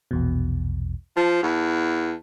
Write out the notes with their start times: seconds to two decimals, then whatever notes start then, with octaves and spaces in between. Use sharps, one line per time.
0.11 A#1 E2 B2
1.17 F3 A5
1.43 E2